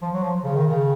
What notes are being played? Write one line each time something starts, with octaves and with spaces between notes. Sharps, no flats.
F3
F#3
F3
C#3
D#3
C#3